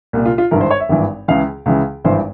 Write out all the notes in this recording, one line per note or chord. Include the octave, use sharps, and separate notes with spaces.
C2 A#2
F4
F4
G#1 G2 E3 A#4
C5
C#5
E5
G#1 G2 E3
C#2 C#3 E3 F5
C#2 C#3 E3
G#1 G2 E3 C5